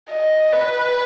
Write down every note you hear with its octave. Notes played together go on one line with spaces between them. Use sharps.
D#5
B4